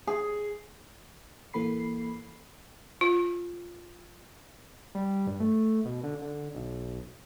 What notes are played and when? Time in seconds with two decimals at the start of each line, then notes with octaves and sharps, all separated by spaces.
0.07 G#4
1.53 A1 E3 A#3 A4 B5 C7
3.01 F4
4.95 G3
5.27 G2
5.40 A3
5.85 B2
6.04 D3
6.22 D3
6.55 B1